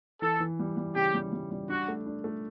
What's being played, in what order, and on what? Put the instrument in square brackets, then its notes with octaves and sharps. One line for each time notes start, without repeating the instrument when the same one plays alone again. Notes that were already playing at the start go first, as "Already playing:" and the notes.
[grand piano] E3 [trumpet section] A4
[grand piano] E3
G3
G3
[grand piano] C#3 [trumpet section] G4
[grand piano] G3
G3
G3
[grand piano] D4 [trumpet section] F#4
[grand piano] A3
D4
A3